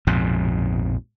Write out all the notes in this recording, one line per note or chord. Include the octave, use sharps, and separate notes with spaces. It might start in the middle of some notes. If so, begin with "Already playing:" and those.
A#1 F2 G#2 B2